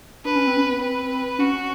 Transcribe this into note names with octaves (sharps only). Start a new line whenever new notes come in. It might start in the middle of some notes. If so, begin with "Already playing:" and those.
D4 B4
C#4
C4
C#4
B3
C4 B4
C#4 F#4